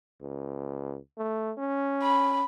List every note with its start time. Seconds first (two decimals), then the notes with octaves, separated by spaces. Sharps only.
0.22 C#2
1.18 A3
1.58 C#4
2.03 B5